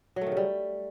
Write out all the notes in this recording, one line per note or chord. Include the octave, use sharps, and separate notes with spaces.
F#3
A3
D#3
C#3
G3